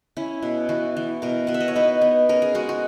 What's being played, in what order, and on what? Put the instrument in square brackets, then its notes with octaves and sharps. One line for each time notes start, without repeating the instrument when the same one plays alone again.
[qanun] C#4 E4
B2
E3 F#4
E3
B2 A#4
B2 F#5
E5
D#5
C#5
D#4 B4
B3
C#4 A#4
G#4
G#3 F#4
F#4